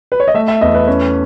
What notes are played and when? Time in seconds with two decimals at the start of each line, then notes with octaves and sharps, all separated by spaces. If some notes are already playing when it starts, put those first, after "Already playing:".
0.12 B4
0.20 C#5
0.28 D#5
0.34 A3 E5
0.48 E5
0.61 E2 D#5
0.75 B4
0.87 C#4 B4